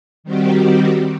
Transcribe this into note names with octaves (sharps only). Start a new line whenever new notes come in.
D#3 G3 C4 F#4 G4